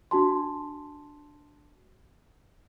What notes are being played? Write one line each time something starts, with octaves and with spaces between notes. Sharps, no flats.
D4 F#4 A5 C6